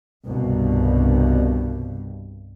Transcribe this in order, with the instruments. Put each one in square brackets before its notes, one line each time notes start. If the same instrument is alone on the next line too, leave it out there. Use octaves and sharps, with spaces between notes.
[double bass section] C2 G2 B2